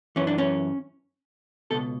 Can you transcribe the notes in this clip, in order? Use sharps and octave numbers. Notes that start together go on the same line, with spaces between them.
F#2 E3 C#4
D4
C#4
C#2 B2 A4